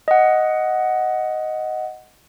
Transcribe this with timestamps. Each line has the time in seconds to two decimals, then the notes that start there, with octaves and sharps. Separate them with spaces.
0.08 D#5 F#5